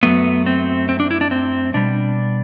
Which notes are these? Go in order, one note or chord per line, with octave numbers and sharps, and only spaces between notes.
F#2 F#3 A3 B3
C4
C4
D4
E4
D4
C4
B2 G3 D4